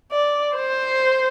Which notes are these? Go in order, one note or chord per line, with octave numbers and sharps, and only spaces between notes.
D5
C5